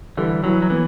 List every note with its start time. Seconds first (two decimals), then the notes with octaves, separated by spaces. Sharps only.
0.17 D3 E3 G3
0.44 E3 F#3
0.62 F#3
0.70 E3 B3